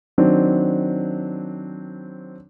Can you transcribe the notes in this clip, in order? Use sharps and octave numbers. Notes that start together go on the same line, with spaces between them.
D#3 F#3 C4 D4